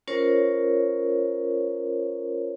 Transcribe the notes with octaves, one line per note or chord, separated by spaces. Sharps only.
C#4 F4 A#4 C5 C#5